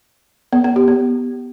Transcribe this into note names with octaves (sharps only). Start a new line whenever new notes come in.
B3
B3
G4
B3